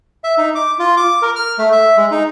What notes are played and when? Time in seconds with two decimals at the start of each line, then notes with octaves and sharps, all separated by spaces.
0.24 E5
0.38 D#4
0.55 D6
0.79 F4
0.97 D6
1.22 A#4
1.36 F6
1.58 A3
1.72 E5
1.97 G#3
2.11 D#4